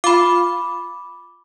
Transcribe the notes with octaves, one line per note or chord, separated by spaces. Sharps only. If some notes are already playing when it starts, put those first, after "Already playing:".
F4 B5 D6